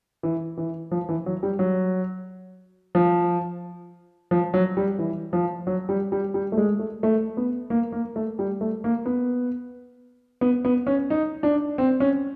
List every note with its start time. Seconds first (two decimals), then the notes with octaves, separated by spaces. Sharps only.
0.23 E3
0.57 E3
0.91 F3
1.09 E3
1.26 F#3
1.43 G3
1.59 F#3
2.95 F3
4.31 F3
4.54 F#3
4.77 G3
4.99 E3
5.33 F3
5.67 F#3
5.89 G3
6.12 G3
6.34 G3
6.52 A3
6.58 G#3
6.79 A3
7.03 A3
7.37 B3
7.70 A#3
7.92 A#3
8.16 A3
8.39 G3
8.61 A3
8.84 A#3
9.06 B3
10.41 B3
10.65 B3
10.87 C#4
11.10 D#4
11.43 D4
11.78 C4
12.00 C#4